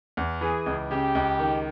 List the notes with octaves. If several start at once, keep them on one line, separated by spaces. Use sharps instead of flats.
E2
E3 G#4
C#2
C#3 G4
C#2
D#3